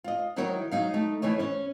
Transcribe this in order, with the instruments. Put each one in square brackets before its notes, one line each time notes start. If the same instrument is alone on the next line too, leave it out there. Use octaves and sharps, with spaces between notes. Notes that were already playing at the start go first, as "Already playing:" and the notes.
[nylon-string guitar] F4 D#5
D#3 F#3 D#4 E4 A#4 C#5
F#3 D#4 F5
A3 D#4
D2 E3 A3 C#5 D#5
C#4 C#5